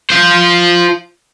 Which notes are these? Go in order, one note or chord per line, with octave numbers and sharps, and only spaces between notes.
F4 C5